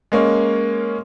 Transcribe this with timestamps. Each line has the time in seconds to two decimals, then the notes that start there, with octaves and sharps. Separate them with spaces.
0.12 G#3 A#3 C#4